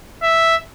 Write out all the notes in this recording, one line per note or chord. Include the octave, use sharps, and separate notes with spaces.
E5